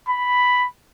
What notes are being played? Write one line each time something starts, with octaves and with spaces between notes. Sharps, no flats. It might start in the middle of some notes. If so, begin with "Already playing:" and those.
B5